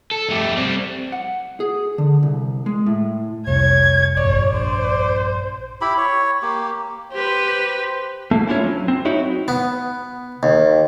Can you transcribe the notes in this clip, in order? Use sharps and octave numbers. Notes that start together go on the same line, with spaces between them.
A4
A3 G4
G3 C4
F#5
G#4
D3
C2
G#3
A2
F1 C2 C#5 G#6
A#1 G2 C#5 D5
C5
E4 G4 B5
C#5
A#3 G4
G4 B4 C5
A3 A#3
C#4 D4 E4 F4 C#5
F#3
C4
D#4 E4 F#4 C#5
B3
D#2